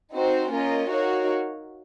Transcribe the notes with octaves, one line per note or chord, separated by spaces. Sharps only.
C4 D#4 F#4 C5
A#3 C#4 F4 A#4 D#5
D#4 F#4 A#4 C#5 F5